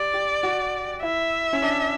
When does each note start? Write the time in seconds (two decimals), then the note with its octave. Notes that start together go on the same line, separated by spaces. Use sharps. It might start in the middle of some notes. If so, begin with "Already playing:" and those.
Already playing: G4 D5
0.13 G4
0.43 F#4
1.02 E4 E5
1.53 C#4
1.62 D4